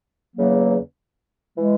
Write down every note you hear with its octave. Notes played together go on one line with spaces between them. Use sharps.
E2 C#3 F#3 A#3
E3 G#3